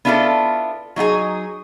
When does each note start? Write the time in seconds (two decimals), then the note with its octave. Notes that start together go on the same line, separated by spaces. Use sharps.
0.05 B3 D4 E4 F4 G4 A4
0.96 F#3 D#4 F4 G#4